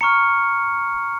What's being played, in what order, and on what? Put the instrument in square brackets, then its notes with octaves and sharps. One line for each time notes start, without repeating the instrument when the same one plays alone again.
[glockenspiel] A#5 C#6 F6 C#7